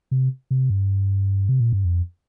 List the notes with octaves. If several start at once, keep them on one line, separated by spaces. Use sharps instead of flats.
C3
C3
G2
C3
A#2
G2
F2